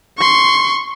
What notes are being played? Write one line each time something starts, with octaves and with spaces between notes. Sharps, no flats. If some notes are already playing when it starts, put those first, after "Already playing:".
C6 C#6